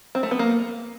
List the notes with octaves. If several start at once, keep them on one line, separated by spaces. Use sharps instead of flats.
C4
A3
B3
A#3